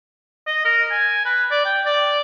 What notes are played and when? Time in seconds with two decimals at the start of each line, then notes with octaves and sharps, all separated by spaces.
0.47 D#5
0.65 A#4
0.91 G#5
1.25 B4
1.51 D5
1.65 G5
1.86 D5